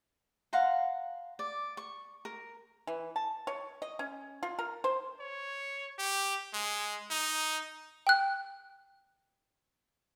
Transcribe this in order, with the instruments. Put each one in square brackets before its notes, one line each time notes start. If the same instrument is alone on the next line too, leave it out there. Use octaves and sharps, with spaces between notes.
[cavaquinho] F5 F#5 A#5 C6
D5
C#6
A#4
[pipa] E3
A5
C#5
D#5
C#4
F4
A#4
C5
[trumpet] C#5
G4
G#3
D#4
[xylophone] G5 F#6